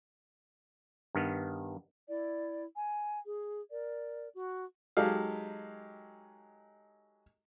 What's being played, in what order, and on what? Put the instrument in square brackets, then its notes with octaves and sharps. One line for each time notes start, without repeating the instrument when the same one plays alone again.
[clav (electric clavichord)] G2 D#3 B3
[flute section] E4 D5
G#5
G#4
A#4 D5
F#4
[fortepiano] F#3 G#3 D#4 G4 A4 F5